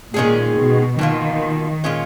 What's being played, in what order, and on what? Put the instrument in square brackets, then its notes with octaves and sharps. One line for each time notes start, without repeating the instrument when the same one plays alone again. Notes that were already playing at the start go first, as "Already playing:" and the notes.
[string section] A#2 [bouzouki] D#3 G#3 C#4 G#4
[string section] B2
[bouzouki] B2 A#3 F4 [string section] D#3
[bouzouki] A#2 G#3 C#4 F4